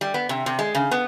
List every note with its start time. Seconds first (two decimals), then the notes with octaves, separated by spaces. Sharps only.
0.01 G3
0.14 B3
0.29 C3
0.46 C3
0.59 G#3
0.75 C#3
0.91 B3